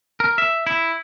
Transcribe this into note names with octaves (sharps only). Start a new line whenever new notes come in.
A#4
E5
E4